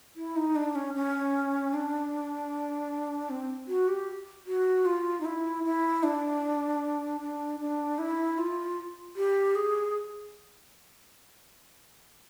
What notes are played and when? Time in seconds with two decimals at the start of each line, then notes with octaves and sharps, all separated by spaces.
0.16 E4
0.36 D#4
0.56 D4
0.75 C#4
0.94 C#4
1.74 D4
3.30 C4
3.68 F#4
3.88 G4
4.47 F#4
4.85 F4
5.21 D#4
5.25 E4
5.64 E4
6.03 D4
7.21 D4
7.60 D4
7.99 E4
8.38 F4
9.16 G4
9.55 G#4